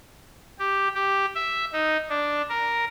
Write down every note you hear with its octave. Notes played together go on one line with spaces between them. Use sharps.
G4
G4
E5
D#4
D4
A#4